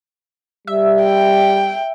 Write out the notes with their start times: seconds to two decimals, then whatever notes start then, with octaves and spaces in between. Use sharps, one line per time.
0.67 G3 E5
1.02 G5